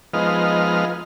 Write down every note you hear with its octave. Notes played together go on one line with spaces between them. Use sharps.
F3 G#3 B3 D#4 F6